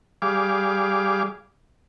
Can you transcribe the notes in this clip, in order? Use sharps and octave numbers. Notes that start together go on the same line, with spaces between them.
G3 G#4 F5 D6